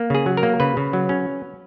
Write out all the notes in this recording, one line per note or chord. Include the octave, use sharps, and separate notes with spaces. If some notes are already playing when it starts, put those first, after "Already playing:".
Already playing: A#3
C#3 G#4
F#3
A#4
A#3
C#3 B4
C#3
F#3
C#4